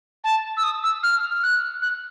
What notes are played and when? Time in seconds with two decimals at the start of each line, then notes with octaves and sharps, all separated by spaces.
0.24 A5
0.57 E6
0.64 D#6
0.83 E6
1.03 F6
1.43 F#6
1.82 F#6